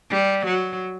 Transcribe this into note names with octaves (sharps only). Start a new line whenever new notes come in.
G3
F#3